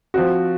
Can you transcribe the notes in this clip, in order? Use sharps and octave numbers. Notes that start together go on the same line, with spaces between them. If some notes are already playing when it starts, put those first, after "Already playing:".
F3 C4 F#4